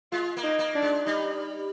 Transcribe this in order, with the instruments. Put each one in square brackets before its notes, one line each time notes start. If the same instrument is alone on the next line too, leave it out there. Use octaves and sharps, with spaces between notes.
[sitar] G#3 [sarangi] F4
[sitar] A#3
[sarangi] D#4
[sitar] A#3
[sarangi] D4
[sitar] G#3
[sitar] G3 [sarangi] D#4